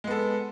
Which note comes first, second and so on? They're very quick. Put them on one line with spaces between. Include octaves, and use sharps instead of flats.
G#3 B3 A4